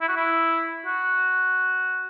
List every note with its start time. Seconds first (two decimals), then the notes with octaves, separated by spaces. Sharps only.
0.01 E4
0.08 F#4
0.16 E4
0.86 F#4